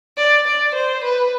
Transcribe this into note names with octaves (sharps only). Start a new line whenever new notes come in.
D5
D5
C5
B4